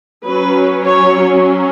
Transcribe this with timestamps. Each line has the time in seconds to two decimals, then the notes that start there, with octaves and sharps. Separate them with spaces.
0.25 F#3 C#4 B4
0.82 C#5